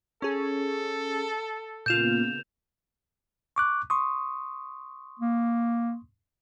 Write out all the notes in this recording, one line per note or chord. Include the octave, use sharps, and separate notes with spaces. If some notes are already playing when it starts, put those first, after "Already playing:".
C#4 G#4 A4
A#2 C#3 A#3 B3 F4 G6 E7 F7
C#6 D6 F#6
C6 C#6 D#6
A#3